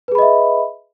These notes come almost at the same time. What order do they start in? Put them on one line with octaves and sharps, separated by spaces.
B4 G#4 B5 D#5 E5